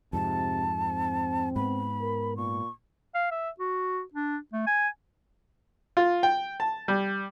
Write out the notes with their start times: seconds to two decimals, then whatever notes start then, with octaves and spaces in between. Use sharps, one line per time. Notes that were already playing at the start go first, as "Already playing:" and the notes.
0.13 F2 G#2 C3 A5
0.77 C4
1.56 G#2 B3 B5
2.01 A#4
2.37 A#2 C#6
3.14 F5
3.31 E5
3.59 F#4
4.13 D4
4.53 A3
4.67 G#5
5.97 F4
6.23 G5
6.60 A5
6.88 G3